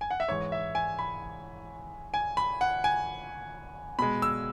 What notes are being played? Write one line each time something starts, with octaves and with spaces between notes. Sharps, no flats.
G#5
F#5
E5
G#2 E3 G#3 C#5
E5
G#5
B5
G#5
B5
F#5
G#5
B2 G#3 B5
E6